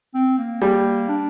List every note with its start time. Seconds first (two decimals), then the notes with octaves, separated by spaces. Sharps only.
0.14 C4
0.38 A#3
0.62 G3 A#3
1.09 D4